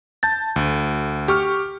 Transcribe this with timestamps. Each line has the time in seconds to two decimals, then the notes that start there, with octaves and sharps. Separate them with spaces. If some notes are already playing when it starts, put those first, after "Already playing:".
0.23 A5 G6 A6
0.56 D2
1.28 G4 C#6 F6